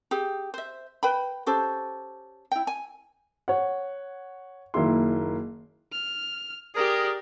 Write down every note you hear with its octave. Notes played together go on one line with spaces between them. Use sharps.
G4 G#4
C5 E5
B4 G5 B5
C#4 G4 A4 C5
E4 G5
G#5
C#5 F#5
F#1 D#3 A#3 E4 C6
F6
G4 G#4 A#4 D5